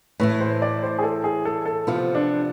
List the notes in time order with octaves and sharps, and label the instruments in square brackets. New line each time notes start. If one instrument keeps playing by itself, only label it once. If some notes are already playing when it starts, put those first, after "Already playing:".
[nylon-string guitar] A2 E3 A3 [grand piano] B4
[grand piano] C5
D5
C5
G#4
A4
G#4
A4
A4
[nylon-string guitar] C3 F3 B3 [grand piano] F4
[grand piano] D4